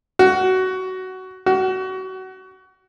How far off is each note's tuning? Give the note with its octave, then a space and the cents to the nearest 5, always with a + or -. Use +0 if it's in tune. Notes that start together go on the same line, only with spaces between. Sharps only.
F#4 +15
F#4 +25